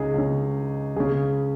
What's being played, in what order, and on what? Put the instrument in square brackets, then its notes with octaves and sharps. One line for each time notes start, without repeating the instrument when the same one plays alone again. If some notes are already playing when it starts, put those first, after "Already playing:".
Already playing: [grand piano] C#2 C#3 D#4 G#4
C#2 C#3
C#2 C#3 G#4